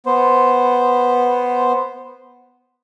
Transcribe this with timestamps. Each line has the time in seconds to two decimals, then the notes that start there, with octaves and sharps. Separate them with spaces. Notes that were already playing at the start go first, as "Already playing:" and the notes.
0.06 B3 C5